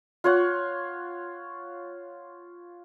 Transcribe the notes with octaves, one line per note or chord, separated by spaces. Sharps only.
F4 C#5 F#5